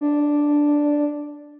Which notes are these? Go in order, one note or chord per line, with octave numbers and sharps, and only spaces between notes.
D4